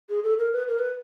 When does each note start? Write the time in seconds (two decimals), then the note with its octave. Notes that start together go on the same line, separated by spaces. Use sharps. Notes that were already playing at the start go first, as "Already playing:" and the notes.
0.09 G#4
0.23 A4
0.39 A#4
0.53 B4
0.68 A#4
0.79 B4